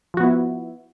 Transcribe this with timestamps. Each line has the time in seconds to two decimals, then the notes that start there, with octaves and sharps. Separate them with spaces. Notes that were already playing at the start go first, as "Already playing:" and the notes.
0.14 F3
0.17 F#4
0.20 B3
0.23 E4